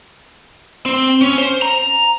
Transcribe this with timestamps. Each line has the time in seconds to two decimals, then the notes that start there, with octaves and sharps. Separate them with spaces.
0.86 C4
1.22 C#4
1.38 C5
1.62 A#5